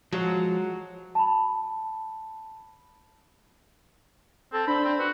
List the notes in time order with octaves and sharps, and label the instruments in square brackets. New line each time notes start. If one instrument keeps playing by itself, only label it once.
[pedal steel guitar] F3 G#3 [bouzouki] F#3
[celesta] A5 B5
[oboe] C4 [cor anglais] A4
[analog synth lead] D4 [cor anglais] C5 [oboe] B5
[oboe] C4
[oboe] F#4 [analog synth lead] B4